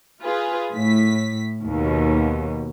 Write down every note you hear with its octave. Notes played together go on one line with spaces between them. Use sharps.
F4 G#4 B4
A2 B6
D#2 B2